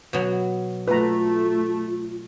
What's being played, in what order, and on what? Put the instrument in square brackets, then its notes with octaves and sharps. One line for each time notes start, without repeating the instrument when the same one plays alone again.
[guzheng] B2 F#3
[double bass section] A3 [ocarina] F4 [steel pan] B4 A#5